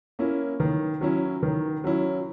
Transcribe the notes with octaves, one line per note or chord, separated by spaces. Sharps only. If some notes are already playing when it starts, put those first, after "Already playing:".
A#3 C#4 E4
D#3
F#3 C#4 E4
D#3
F#3 C#4 E4